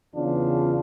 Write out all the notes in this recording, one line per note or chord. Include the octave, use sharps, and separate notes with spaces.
E2 C#3 B3 D4 F4